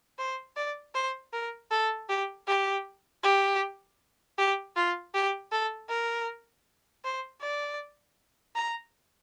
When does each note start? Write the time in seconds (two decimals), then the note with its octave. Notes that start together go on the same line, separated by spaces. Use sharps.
0.19 C5
0.57 D5
0.94 C5
1.33 A#4
1.71 A4
2.08 G4
2.47 G4
3.23 G4
4.38 G4
4.76 F4
5.14 G4
5.52 A4
5.89 A#4
7.04 C5
7.41 D5
8.56 A#5